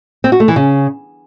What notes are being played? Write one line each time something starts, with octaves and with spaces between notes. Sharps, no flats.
C4
F#4
A3
E3
C#3